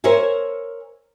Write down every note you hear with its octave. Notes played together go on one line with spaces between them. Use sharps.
A#4 C5 C#5 E5 G#5